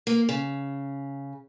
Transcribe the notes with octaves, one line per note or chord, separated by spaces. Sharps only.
A#3
C#3